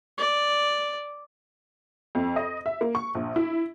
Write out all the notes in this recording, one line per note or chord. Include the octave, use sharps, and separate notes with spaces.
D5
F2
D#5
E5
A#3
C#6
A#1
E4